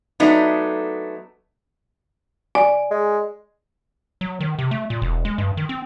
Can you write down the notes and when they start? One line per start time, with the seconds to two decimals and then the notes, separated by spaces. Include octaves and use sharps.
0.20 F#3 A3 B3 D4 D#4
2.55 D5 G#5
2.90 G#3
4.21 F#3
4.41 D#3
4.59 C3
4.71 A3
4.90 A#2
5.02 E1
5.25 G#3
5.38 G2
5.57 D#3
5.69 C4